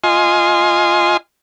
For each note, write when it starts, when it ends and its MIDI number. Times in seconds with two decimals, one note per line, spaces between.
0.04 1.17 65
0.04 1.17 75
0.04 1.17 80
0.04 1.17 84